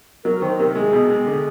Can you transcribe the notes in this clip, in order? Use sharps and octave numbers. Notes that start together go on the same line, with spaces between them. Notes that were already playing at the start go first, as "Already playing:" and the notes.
F#3 A#4
D#3 C5
C3 A#4
G#3 G#4
B2
G#3
D3